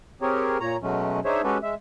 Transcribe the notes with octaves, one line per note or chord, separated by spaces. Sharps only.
C4 G4 G#4 A#4 C#5
A#2 C#5 A#5
B2 F#3 G#3 A3 C#4
D4 D#4 G#4 C5 C#5 E5
G#3 C#4 F#4 G4 A4 B4
G#3 E5